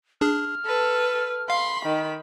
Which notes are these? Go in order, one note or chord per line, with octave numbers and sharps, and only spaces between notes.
D4 G#4 F6
A4 B4
F5 B5 C6
D#3